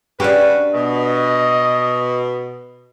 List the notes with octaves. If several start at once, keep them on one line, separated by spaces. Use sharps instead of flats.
C#3 D4 F#4 G4 B4
B2 D#5